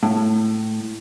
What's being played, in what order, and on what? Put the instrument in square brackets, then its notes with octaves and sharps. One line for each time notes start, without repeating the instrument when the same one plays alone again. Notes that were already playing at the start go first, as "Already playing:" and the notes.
[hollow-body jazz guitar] A2